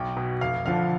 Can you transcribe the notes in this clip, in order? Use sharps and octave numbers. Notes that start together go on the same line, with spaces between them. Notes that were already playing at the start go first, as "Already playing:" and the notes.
Already playing: B1 G5
B2
F1 F5
F2 D3 F3 F5